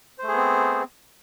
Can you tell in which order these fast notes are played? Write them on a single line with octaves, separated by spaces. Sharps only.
C5 A3 G#4 B3 C4